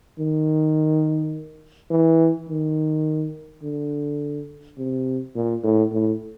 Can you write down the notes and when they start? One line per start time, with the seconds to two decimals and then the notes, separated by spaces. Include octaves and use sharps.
0.19 D#3
1.90 E3
2.49 D#3
3.62 D3
4.78 C3
5.35 A#2
5.63 A2
5.92 A2